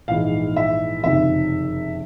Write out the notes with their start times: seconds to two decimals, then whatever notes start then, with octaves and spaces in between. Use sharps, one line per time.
0.08 A#1 G#2 E3 F5
0.56 E5
1.03 F#1 F2 C3 D#3 E5